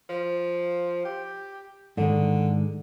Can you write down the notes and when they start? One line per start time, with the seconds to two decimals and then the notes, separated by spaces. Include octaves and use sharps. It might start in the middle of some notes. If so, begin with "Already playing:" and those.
0.09 F3
1.04 G4
1.97 G#2 D3 D#3 G#3